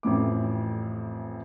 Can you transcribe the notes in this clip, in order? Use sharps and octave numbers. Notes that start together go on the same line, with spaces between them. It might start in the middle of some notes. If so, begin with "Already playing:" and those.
A1 F2 A2 D6